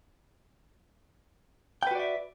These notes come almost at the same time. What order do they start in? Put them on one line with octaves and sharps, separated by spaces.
G5 B4 F#4 D5 E5